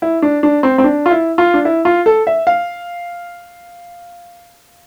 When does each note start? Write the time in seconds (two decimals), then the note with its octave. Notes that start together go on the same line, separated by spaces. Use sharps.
0.02 E4
0.22 D4
0.43 D4
0.63 C4
0.78 C4
0.84 D4
1.06 F4
1.11 E4
1.38 F4
1.54 D4
1.65 E4
1.85 F4
2.06 A4
2.27 E5
2.47 F5